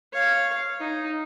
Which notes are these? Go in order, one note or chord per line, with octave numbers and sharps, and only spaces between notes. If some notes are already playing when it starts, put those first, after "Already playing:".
C#5 F5
D#4